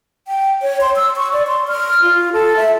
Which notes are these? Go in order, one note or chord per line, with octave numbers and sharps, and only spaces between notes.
G5
C#5
C6
E6
C#6
D5
C6
F6
F4
A4
E5